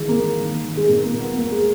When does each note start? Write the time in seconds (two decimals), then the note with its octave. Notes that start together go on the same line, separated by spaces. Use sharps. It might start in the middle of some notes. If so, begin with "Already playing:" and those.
Already playing: D#3 E3 G#3
0.08 A#3
0.16 D#3
0.40 D#3
0.64 D#3
0.77 G#3
0.88 A#2 A#3
1.04 A#3
1.12 A#2
1.20 B3
1.36 E2 A#3
1.52 G#3